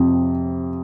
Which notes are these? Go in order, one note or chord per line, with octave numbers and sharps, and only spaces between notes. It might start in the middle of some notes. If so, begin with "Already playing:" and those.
Already playing: F2 C3